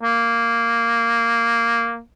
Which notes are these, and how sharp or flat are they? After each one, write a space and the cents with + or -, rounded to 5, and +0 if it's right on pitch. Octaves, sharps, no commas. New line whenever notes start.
A#3 -5